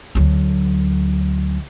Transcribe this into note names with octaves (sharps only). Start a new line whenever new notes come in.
D2 F#3